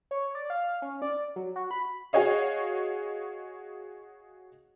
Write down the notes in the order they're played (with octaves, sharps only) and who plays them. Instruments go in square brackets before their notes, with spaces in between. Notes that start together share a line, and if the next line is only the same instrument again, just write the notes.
[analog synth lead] C#5
D5
F5
C#4
D5
F#3
F#4
B5
[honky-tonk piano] F#4 G#4 C#5 D#5 F5